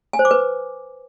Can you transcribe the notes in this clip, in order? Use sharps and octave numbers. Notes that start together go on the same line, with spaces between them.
G#5
C5
D6
B4